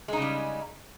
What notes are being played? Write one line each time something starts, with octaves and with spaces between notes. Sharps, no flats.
C#3 G3 G#3 D#4